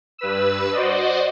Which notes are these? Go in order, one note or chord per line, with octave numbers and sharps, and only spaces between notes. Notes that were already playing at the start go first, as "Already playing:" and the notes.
G2 B4 E6
F#4 C5 D5 D#5